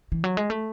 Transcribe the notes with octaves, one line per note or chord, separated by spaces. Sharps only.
E3
F#3
G#3
A3